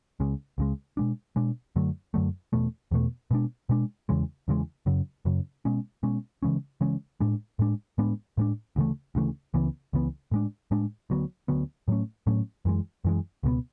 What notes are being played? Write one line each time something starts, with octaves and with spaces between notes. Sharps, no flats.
C#2 C#3 G#3
C#2 C#3 G#3
B2 G#3 D4
B2 G#3 D4
F#2 D3 F#3 A3
F#2 D3 F#3 A3
E2 B2 A3
E2 B2 A3
B2 G#3 D4
B2 G#3 D4
E2 C#3 E3 G#3
E2 C#3 E3 G#3
F#2 C#3 F#3
F#2 C#3 F#3
B2 G#3 C#4
B2 G#3 C#4
C#3 E3 G#3 C#4
C#3 E3 G#3 C#4
A2 G#3 D4
A2 G#3 D4
A2 G#3 B3 D4
A2 G#3 B3 D4
D2 C#3 E3 A3
D2 C#3 E3 A3
C#2 C#3 E3 B3
C#2 C#3 E3 B3
A2 G#3 D4
A2 G#3 D4
D2 D3 F#3 B3
D2 D3 F#3 B3
A2 F#3 A3 C#4
A2 F#3 A3 C#4
F#2 E3 G#3
F#2 E3 G#3
C#2 B2 G#3 B3